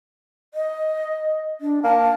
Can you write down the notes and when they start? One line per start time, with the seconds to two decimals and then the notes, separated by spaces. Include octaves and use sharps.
0.54 D#5
1.61 D4
1.83 A#3 A5